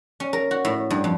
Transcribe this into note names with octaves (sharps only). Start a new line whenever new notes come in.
C#4
A#4
F#4
A2
G2
F2